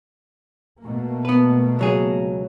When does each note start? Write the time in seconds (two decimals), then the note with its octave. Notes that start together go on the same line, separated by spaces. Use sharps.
0.83 B2 A3 A#3
1.25 B3 B4
1.79 C#2 F#3 G#4